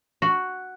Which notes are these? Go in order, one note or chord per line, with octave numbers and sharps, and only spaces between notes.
F#4